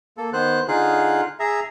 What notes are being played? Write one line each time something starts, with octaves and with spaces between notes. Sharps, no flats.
A#3 A4
D#3 B3 C5 F#6
D3 D#4 F4 G#4 F5 F#6
G#4 E5 A#5